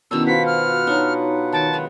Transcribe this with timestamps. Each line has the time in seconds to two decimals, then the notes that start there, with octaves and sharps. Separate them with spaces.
0.11 B2 D#3 B3 C#4 D4 E4 E6
0.27 F4 F#4 B4 C5 F5 F#5 B6
0.46 F6
0.87 D4 D#4 F#4 C#5 A#5
1.53 D#3 G5 A5 C#6
1.73 F#3 G#3 D4